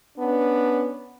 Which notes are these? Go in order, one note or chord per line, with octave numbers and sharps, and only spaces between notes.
B3 C#4 D4